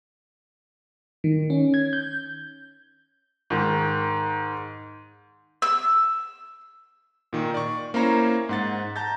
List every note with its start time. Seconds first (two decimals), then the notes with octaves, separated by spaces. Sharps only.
1.24 D#3
1.50 C#4
1.74 G#6
1.93 G6
3.50 G#2 D#3
5.62 E6
7.33 A#2 D#3
7.54 D5 C#6
7.94 A#3 C#4 E4 C5 C#5 A#5
8.49 G#2 F#5 A6
8.96 A5 A#5 G6 A6